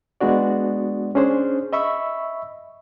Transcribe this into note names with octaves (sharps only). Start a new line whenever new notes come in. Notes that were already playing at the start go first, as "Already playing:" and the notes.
G#3 B3 D4 F#4 D5
C#4 D4 G#4 C5
D#5 E5 B5 C#6 E6